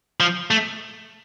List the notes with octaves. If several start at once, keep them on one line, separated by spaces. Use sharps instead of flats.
F3
A3